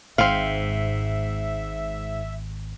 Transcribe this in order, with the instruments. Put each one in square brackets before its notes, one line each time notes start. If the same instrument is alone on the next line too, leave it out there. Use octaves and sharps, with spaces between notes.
[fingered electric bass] G#1 [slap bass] G#2 [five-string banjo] C4 F5 [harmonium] E5